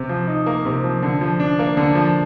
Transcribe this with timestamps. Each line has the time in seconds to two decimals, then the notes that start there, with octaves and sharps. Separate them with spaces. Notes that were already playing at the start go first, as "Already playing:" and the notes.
Already playing: C3
0.09 F3
0.28 D#4
0.46 A#3
0.65 C3
0.84 F3
1.03 D3
1.21 F3
1.40 D4
1.59 A#3
1.77 D3
1.95 F3